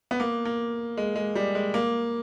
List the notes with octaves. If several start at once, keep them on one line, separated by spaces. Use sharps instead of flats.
B3
A#3
A#3
G#3
G#3
G3
G#3
A#3